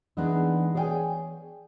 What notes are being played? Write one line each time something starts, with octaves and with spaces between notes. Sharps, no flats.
E3 G#3 A#3 B3 D4 D#4
G#4 C#5 D5 F5 G5 G#5